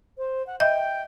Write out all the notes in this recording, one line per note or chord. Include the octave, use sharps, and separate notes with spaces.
C5
F#5
D#5 E5 G5 G6